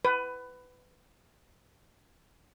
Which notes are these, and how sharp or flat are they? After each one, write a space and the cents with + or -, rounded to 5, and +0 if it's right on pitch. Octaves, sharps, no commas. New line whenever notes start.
B4 +20